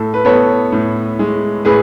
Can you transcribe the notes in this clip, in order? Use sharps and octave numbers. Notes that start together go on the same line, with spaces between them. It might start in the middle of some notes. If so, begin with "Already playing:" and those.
Already playing: A2 A4
B4
B3 A4 C#5
A2
G#3
A2 G#4 B4